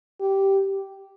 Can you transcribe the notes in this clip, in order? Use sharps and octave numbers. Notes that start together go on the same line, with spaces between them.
G4